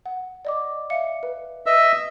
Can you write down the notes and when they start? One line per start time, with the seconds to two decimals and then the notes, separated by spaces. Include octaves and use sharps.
0.06 F#5
0.45 D5 D#5 D6
0.90 E5 F5 C#7
1.23 B4
1.66 B4 D#5 E5 E6